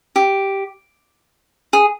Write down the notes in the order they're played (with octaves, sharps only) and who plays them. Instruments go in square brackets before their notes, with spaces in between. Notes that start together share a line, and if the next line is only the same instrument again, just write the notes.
[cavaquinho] G4
G#4